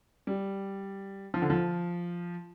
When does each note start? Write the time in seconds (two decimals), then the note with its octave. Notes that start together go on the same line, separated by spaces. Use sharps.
0.27 G3
1.34 F3
1.42 D3
1.50 F3